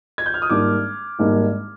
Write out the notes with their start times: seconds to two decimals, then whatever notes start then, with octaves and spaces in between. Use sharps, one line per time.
0.18 G#6
0.26 G6
0.34 F6
0.42 D#6
0.50 G#1 G#2 G3 A#3 D4 D6
1.19 G#1 G#2 G3 A#3 D4